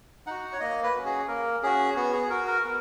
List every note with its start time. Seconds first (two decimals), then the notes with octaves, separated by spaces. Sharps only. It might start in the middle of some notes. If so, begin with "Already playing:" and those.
0.27 D#4 F#4 F#5
0.53 C#5
0.60 A#3 D#5
0.83 B4
0.94 C#4 F#4
1.06 G#4
1.28 A#3 A#4
1.63 C#4 F#4 G#4
1.96 B3 F#4
2.13 G#4
2.30 F#4 A#4
2.47 A#4
2.65 B3